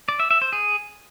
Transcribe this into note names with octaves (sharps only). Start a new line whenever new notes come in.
D5
E5
E5
C5
G#4